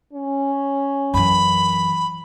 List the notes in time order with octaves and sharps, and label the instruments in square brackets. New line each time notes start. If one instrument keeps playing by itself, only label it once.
[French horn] C#4
[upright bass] F#2 E3 [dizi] B5